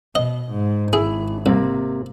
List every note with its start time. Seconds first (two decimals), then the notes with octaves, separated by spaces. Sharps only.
0.15 B2 D#5
0.51 G#2
0.93 G#1 E4 G#4 E5
1.46 C2 C3 A#3